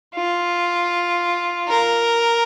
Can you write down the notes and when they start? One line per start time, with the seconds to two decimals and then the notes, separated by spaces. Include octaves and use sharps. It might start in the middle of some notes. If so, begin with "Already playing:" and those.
0.15 F4
1.68 A#4